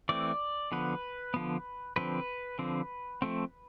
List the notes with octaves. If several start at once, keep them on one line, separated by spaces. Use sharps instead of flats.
E3 A3 C4 D5
D3 F3 B3 B4
D3 F3 B3
D3 F3 C4 B4
D3 F3 C4
F3 A3 C4